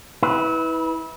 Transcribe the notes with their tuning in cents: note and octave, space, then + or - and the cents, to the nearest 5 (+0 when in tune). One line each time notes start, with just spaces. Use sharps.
E4 -30 B4 +0